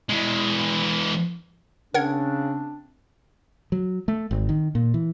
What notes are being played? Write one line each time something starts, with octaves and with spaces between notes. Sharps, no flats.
E3 G#3
C#3 C4 D4 A#4 F#5 G#6
F#3
A3
G#1
D#3
A#2
E3